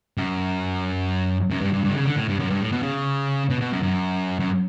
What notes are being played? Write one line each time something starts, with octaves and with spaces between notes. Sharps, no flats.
F#2
F#2
G2
G2
G2
D3
C#3
D3
A2
G2
F#2
G2
A2
B2
C#3
B2
B2
F#2
F#2
F#2